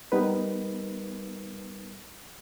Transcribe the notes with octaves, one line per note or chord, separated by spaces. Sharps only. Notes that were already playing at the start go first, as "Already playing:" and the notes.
G3 B3 D#4 A#4 B4